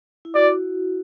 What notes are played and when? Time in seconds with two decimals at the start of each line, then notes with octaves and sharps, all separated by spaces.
0.25 E4
0.35 F#4 D5